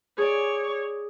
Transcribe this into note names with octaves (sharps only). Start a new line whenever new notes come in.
G#4 C#5 D5